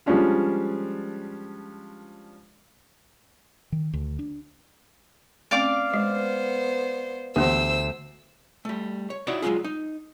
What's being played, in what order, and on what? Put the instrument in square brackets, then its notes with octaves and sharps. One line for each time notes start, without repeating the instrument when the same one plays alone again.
[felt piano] F3 G3 G#3 C#4 D4 F4
[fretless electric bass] D#3
D2
D4
[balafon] A3 C4 C#4 [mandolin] D5 F5 D6
[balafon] G#3 [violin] B3 C5
[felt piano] D2 [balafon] E3 B3 G4 [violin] C5 E6
[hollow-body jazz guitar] G3 A3
C#5
D#4 E4 F#4 C#5 D5
F#3 G#3 D4 F4 G#4
D#4